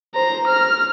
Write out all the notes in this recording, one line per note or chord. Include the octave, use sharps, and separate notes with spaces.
C5 A#5
F6